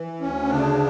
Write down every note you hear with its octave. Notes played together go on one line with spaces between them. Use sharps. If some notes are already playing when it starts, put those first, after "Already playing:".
Already playing: E3
D2 C#4
C#3 D4